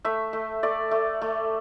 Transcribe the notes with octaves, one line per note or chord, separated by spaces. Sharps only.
A3 E5
A3
A3 D5
A3
A3